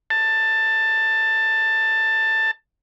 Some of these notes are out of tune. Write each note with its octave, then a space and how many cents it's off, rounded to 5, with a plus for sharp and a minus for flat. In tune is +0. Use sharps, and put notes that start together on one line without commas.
A5 +15